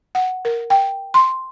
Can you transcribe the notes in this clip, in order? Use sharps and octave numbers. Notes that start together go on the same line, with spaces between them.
F#5
A#4
G5
C6